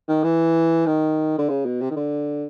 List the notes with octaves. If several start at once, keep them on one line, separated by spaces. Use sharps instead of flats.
D#3
E3
D#3
D3
C#3
B2
C3
D#3
D3